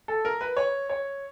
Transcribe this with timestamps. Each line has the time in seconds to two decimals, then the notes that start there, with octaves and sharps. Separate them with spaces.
0.08 A4
0.25 A#4
0.41 B4
0.57 C#5
0.90 C#5